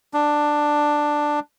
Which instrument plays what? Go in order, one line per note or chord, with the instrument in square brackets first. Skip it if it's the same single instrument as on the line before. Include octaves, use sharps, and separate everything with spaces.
[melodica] D4